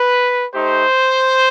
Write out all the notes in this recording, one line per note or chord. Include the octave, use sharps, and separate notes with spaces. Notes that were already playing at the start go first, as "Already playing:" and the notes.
Already playing: B4
A3 D#4 G4 C5